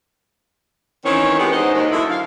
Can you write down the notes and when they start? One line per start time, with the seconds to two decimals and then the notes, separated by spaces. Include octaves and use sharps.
1.05 D#3 E3 C4 C#4 C#5
1.39 G#3 B3 D4 F#4 G4
1.52 G#3 D#4 F#4 C5
1.74 D#2 D#3
1.91 D3 F#3 E4
2.10 F5